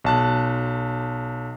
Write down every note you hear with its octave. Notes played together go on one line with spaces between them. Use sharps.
B1 A5 F#6